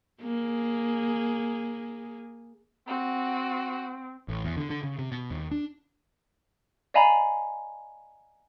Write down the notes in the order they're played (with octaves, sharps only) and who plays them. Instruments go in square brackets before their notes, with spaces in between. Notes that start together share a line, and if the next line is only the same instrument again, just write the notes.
[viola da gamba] A#3 G#4
[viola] C4 [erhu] F#4
[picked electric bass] A1
E2
D3
D3
C#3
C3
B2
D#2
D4
[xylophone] D5 D#5 F5 G#5 A#5 B5